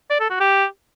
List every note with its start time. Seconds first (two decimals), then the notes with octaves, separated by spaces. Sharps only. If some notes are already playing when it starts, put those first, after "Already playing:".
0.10 D5
0.20 A4
0.30 F#4
0.40 G4